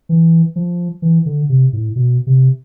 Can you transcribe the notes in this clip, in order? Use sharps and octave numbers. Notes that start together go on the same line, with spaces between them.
E3
F3
E3
D3
C3
A2
B2
C3